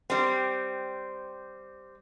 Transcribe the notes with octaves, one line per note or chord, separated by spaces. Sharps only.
G3 C4